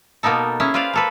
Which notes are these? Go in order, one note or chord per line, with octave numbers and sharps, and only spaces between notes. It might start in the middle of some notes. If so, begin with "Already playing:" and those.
B2 A#3 B3 D#4 A4
C#4 E4 G#4
F4 B4 C5 D5 F5
A#3 A4 B4